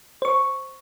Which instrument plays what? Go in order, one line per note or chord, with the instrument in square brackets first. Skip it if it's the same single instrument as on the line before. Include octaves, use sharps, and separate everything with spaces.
[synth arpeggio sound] C5 C#6